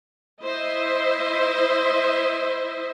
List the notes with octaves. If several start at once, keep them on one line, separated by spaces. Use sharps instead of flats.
E4 C5 D#5 E5